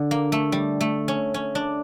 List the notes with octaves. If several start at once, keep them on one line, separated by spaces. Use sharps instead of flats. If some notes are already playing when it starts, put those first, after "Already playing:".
Already playing: D3
A#3
A3
G3
A3
C#4
C#4
D4